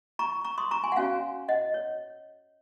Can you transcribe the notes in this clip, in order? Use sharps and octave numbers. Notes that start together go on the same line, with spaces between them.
A#5 C#6
A#5 C#6
C6 D#6
A#5 C#6
G#5 C6
F#5
C#4 F#4 C#5 F5 G#5
D#5 F#5
C#5